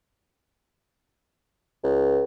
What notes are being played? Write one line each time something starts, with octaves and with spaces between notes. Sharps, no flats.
C#2